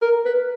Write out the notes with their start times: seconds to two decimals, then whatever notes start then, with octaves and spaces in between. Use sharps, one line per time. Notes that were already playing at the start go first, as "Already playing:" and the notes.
0.02 A#4
0.26 B4